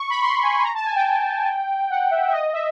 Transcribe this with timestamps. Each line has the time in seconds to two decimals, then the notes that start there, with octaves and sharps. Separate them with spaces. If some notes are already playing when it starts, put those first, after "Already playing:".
Already playing: C#6
0.10 B5
0.22 C6
0.43 G#5
0.64 A#5
0.74 A5
0.85 G#5
0.96 G5
1.90 F#5
2.11 E5
2.28 E5
2.32 D#5
2.53 E5